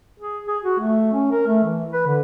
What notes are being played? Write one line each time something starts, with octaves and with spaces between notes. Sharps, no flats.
G#4
G#4
F#4
A3
C#4
A#4
A3
E3
B4
D3